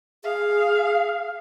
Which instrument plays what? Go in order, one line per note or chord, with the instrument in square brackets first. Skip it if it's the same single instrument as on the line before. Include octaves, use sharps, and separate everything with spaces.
[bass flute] G#4 [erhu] F5